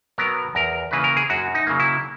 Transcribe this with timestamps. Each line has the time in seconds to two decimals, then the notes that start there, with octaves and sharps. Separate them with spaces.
0.18 F#3 B3 A#4
0.55 E2 A#4
0.91 C#3 E3 A#3 B4
1.04 A#4
1.17 G#4
1.30 F#2 F#4
1.55 D#4
1.67 C#3 F#3 A#3
1.80 E4